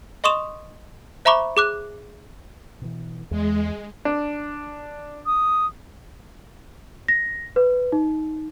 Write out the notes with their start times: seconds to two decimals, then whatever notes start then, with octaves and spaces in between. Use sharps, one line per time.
0.24 D#5 C6 C#6 D#6 E7 F7
1.25 C5 E5 A#5 B5 C#6 D6
1.57 G#4 D6 F#6
2.82 B2 E3
3.31 E2 G#3
4.05 D4
5.26 D#6
7.08 A#6
7.56 B4
7.92 D#4